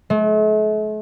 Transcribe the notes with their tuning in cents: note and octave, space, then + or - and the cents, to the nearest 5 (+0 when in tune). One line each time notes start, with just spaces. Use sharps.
A3 -45